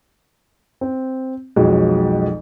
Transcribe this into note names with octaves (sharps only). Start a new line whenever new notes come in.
C4
B1 F2 F#3 G#3